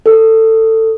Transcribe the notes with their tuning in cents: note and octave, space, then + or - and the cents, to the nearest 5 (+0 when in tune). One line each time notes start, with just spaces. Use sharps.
A4 +20